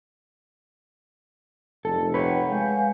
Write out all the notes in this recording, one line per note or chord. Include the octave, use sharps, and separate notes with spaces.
F1 A4
B4 C#5 E5 F#5 G5
G#3 F5 G#5 G6